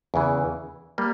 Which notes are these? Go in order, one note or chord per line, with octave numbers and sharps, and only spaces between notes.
E2 C#3 E3
G3 A#3